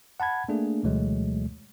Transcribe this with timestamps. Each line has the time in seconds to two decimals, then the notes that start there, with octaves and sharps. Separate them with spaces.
0.20 F#5 A5 B5 G#6
0.49 A3 A#3 D4 G#4
0.83 D2 B2 E3 F#3 G#3 A3